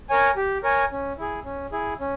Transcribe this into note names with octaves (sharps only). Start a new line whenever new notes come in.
A#4 C#5 G#5
G4
A#4 C#5 G#5
C#4
E4 G#4
C#4
E4 G#4
C#4